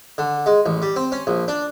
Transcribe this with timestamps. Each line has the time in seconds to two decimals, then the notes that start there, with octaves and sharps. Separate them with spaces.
0.18 D3
0.46 G#3
0.66 A1
0.82 G3
0.96 C4
1.12 C#4
1.27 A#1
1.48 D4